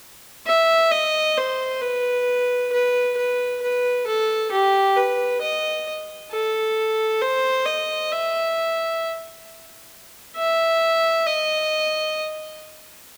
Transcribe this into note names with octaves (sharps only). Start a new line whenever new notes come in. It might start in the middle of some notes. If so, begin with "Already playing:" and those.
E5
D#5
C5
B4
B4
B4
B4
A4
G4
B4
D#5
A4
C5
D#5
E5
E5
D#5